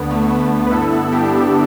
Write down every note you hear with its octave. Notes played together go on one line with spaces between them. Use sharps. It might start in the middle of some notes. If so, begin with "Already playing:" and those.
Already playing: D2 D3 B3
A3
B3
B4
G2 D3 E4 A4
B3 E4
D4 G4
B3 E4